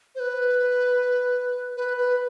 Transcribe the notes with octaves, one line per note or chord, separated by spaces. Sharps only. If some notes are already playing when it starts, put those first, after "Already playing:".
C5
B4
B4
B4